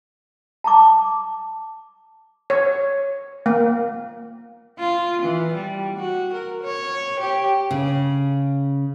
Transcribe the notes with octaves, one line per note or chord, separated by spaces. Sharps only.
A5 A#5 D6
C#5
A#3
F4
E3
G3
F#4
A#4
C#5
G4
C#3